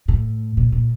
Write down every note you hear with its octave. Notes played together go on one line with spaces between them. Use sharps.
A2
A#2
A#2